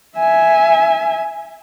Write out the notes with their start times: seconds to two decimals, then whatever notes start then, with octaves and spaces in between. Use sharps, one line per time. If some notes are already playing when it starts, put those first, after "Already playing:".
0.18 E5 G#5